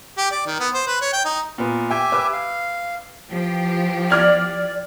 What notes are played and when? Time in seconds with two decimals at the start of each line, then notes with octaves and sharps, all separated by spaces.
0.18 G4
0.31 D5
0.46 D#3
0.60 B3
0.74 C5
0.87 B4
1.01 C#5
1.13 G5
1.25 D#4
1.58 A#2 B3
1.91 G4 E5 G5 G#5
2.12 B4 D6 E6
2.33 F5
3.31 E3 F3 G4
4.11 D5 D6 F6 G#6